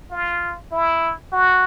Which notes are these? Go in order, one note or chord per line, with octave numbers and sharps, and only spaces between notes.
F4
E4
F#4